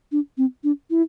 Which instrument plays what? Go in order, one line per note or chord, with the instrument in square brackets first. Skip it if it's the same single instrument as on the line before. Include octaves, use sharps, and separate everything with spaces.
[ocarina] D4
C4
D4
E4